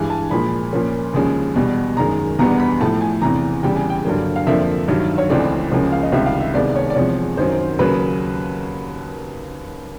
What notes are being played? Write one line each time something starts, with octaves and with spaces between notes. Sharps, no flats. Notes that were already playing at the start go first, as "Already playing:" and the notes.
Already playing: G2 E3 G#3 G#5
A5
A#2 F3 G#3 B5
A#2 F3 A#3 C#4
D#2 C#3 F3 G#3 C#4
E2 B2 G3
F#2 D#3 G#3 A#5
E2 B2 G3 B3 D4 A#5
B5
A2 F3 A3 A5
G#5
E2 C3 E3 A#5
E2 C#3 E3 G3 G5
G#5
G5
G2 D3 F#3 A#3
F5
F2 D3 F3 A#3 E5
G2 D#3 F#3
C#5
C#2 C#3 E3 A3 C4 D5
C#2 C#3 F3 A#3 C#4
F5
D#5
C#2 C3 D#3 G3 E5
F5
E5
C2 C3 D#3 G#3 B3 D5
C#5
D5
E2 C3 F3 G#3 C#5
F#2 D#3 F#3 C5
D#2 C#3 F#3 A#3 B4